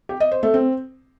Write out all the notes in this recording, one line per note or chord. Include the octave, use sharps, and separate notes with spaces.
G4
D#5
C5
A3
C4